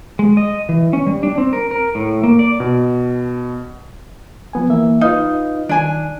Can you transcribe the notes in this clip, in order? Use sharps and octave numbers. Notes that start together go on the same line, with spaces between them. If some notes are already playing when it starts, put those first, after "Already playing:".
G#3
D#5
E3
C#4
G3
D4
C4
A#4
A#4
A2
A#3
D5
B2
F3 B3 G#5
E3 A#3 E5
D#4 F4 B4 F5
D#3 D4 G#5